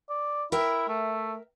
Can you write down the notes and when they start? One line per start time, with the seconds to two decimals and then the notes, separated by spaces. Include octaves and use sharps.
0.09 D5
0.52 E4 A#4 E5 G5
0.88 A3